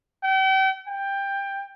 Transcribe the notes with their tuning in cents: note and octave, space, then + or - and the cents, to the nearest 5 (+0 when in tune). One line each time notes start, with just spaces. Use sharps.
G5 -40
G5 +15